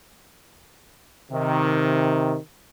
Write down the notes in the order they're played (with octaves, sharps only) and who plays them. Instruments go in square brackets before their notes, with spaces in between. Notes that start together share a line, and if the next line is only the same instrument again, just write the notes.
[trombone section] C3 D#3